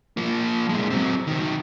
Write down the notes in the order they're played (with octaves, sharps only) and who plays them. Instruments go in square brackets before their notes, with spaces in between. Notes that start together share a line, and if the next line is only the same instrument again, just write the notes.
[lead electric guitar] F3 A#3
A#2 G#3
F#3 C4
D#3 F#3